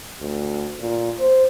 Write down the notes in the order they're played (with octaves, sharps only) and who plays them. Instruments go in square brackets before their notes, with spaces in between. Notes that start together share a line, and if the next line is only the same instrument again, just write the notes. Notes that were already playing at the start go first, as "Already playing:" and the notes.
[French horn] D2
A#2
C5